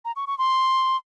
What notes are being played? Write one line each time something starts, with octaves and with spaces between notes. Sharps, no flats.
A#5
C#6
C#6
C6